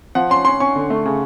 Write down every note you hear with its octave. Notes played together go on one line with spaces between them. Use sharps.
F3 F#5
C#4 C6
C#4 C6
C#4 C#6
D3
A3
C#3